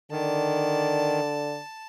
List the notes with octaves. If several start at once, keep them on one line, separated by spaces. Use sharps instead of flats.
D3 D#3 D5 A5